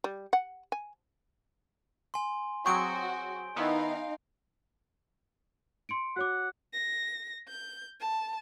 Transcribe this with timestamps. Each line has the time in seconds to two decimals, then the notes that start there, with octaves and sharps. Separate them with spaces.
0.04 G3
0.33 F#5
0.72 G#5
2.14 G#5 C6
2.66 F#3 C4 F#4 G#4 C#6 G6 D7 G7
3.56 D#3 B3 D#4 E4 F5
5.89 C6 C#7 D7
6.16 F#4 C#5 F#5 D6
6.73 A#6
7.48 G6
8.00 A5